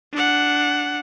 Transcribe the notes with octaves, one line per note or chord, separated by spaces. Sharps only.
D4 F#5